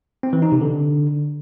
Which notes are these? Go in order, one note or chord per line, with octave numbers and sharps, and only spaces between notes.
C4
E3
D#4
C3
D3